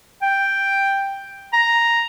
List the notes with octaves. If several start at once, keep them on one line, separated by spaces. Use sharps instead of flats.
G5
A#5